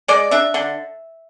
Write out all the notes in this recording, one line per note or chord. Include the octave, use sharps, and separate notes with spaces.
G#3 D5
D4 E5
D3